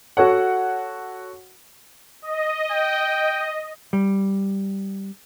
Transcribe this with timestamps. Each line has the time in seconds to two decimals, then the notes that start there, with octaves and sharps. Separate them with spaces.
0.17 F#4 A4 C#5 F#5
2.22 D#5
2.72 G5
3.93 G3